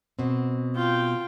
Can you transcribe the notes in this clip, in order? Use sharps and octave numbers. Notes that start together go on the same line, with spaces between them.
B2 C4
F4 G5